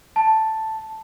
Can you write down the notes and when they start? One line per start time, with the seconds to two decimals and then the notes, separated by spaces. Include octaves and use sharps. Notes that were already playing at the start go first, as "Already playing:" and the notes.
0.16 A5